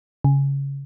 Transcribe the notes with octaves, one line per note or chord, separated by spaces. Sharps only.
C#3